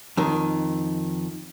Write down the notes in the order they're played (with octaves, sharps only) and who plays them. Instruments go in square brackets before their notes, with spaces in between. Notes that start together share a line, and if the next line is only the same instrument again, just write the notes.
[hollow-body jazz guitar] F2 D#3